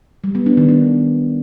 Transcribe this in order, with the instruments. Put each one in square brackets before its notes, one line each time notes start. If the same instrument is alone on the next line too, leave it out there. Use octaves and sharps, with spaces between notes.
[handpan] G3
B3
D4
D#3
D4